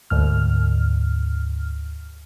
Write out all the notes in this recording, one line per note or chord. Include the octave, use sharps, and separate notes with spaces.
D2 G#2 F6